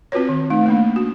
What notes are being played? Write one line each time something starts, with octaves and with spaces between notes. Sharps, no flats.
C4 F4 F#4 B4 C#5
D#3
A3 D#4
A3 A#3 D4
F#4